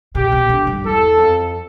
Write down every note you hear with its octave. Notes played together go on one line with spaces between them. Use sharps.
B2 G4
B2
D3
G2
E2 A4
F2